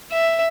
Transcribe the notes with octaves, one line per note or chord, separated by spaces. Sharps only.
E5